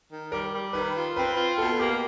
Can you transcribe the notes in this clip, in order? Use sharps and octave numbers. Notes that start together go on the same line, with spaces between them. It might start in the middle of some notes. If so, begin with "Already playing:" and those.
D#3
G3 A#4
G3
D#3 B4
F4
C4 B4
F4
B2 A4
A#3 G4